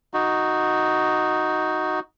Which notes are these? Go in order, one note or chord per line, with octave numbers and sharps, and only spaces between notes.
D#4 F#4